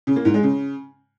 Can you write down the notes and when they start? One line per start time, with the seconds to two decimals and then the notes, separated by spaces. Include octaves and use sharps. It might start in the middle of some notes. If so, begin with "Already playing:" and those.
0.07 C#3
0.16 A#3
0.25 G#2
0.34 G#3
0.43 C#3